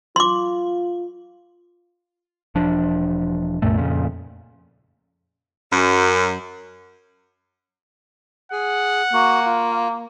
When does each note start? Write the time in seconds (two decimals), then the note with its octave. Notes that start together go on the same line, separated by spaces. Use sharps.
0.16 F4 C6 D6
2.55 E1 F3 D4
3.62 C2 F#2 A#2 A3
3.78 F2 A#2 C#3
5.71 F#2
8.52 G#4 F#5
9.13 A#3 F#4
9.46 F4